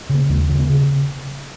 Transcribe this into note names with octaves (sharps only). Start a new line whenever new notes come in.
C#3
A#3
D#2 G#3
C#3
B3
C#3